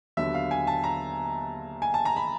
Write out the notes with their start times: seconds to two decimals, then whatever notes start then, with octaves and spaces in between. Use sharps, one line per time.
0.17 D#2 D3 F#3 B3 E5
0.34 F5
0.51 G#5
0.67 A5
0.84 A#5
1.82 G#5
1.94 A5
2.05 A#5
2.16 B5